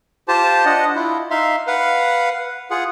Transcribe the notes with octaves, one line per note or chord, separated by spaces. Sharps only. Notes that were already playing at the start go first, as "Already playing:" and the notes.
F4 G4 C5 A5
D4 D#5 F#5
E4 F4
D#4 E5 F5 C6
B4 F5 F#5
F4 G#4 F#5